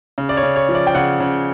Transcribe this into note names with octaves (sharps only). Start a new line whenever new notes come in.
C#3
D5
C#5
C#3
C#5
F3
D5
G5
C#3 F#5
C#3